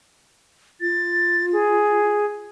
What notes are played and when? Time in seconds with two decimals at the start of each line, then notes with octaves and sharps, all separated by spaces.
0.81 F4 A6
1.53 G#4